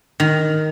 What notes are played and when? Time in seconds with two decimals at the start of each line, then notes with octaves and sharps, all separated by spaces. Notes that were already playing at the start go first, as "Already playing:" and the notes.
0.20 D#3